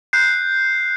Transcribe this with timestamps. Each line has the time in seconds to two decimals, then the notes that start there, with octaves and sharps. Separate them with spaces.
0.13 F#6 G6 C7